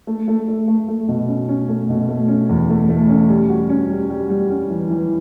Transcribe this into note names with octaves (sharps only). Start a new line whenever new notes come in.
A3
A3
A3
A3
A3
B2
C#4
C#4
A3
B2
A3
C#4
E2
A3
A3
C#4
G3
F#4
C#4
G3
G3
G3
C#4
E3
E3